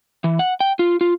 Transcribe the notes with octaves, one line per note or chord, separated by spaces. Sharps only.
E3
F#5
G5
F4
F4